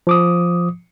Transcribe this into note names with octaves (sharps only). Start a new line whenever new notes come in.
F3 D6 D#6